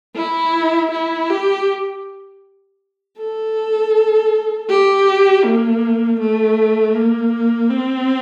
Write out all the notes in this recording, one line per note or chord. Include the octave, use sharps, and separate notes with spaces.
E4
E4
G4
A4
G4
A#3
A3
A#3
C4